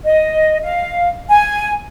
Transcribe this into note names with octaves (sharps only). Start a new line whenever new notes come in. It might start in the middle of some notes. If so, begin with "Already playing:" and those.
D#5
F5
G#5